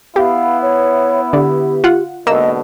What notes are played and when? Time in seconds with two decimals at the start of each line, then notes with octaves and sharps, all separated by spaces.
0.16 B3 E4 G4 F5
0.62 C#5
1.33 D3 G4
1.84 F4 F#5
2.27 G#2 B2 D3 A#3 D#5 E6